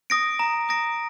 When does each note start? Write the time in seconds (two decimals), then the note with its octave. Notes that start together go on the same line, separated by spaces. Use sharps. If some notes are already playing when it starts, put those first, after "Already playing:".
0.10 D#6 A#6 D7
0.39 A#5
0.69 D#6 A#6 D7